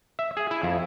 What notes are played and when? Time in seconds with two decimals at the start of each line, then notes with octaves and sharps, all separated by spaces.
0.19 E5
0.37 G#4
0.51 E4
0.63 F2